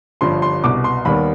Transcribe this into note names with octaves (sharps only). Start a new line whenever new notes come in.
G1 G2 F3 C6
C6
C2 B2 B3 D6
C6
D#2 D#3 G3 B3 B5